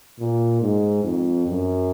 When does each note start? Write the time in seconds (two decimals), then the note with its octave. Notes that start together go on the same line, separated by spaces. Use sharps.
0.19 A#2
0.61 G#2
1.04 F2
1.48 F#2